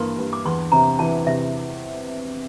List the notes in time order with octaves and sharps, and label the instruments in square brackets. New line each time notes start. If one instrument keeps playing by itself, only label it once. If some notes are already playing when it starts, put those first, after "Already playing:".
Already playing: [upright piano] G2 E3 A#3 [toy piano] C6
[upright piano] G2
[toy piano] D6
[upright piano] E2 [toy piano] C6
[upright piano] C3 [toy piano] A#5
[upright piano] E3 [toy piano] A5
[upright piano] C3 [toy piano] E5